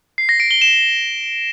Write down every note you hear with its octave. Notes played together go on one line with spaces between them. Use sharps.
C7
A#6
D7
G7
E7